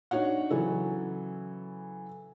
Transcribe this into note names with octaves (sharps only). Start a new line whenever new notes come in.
D4 D#4 F#4 C#5 F#5
C#3 E3 F#3 C#4 A4